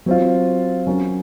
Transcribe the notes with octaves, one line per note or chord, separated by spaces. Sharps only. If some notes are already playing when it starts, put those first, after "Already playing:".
F#3 C4 F4
F#3 C#4 F#4 A#4